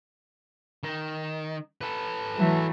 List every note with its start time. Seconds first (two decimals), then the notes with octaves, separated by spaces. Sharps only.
0.83 D#3
1.81 A4 B4
2.37 E3 F#3 A3